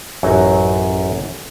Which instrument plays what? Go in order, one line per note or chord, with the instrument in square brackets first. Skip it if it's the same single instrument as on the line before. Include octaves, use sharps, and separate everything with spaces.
[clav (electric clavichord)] A1 F#2 F#3 D#4 F#5